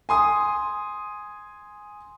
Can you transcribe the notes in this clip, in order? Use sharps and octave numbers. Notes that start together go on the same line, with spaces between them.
G#5 C6 D#6